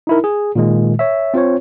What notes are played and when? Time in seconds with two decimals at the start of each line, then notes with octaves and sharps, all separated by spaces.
0.07 D#4 E4 A#4
0.24 G#4
0.56 A#2 D#3 G#3
0.99 C#5 E5
1.34 C4 F4 C5 C#5